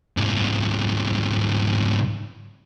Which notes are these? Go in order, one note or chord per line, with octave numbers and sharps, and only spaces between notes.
C2 G#2